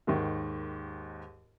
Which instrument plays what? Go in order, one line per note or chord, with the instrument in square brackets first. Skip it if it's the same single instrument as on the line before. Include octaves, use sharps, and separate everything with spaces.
[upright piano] D#2 G#2 D#3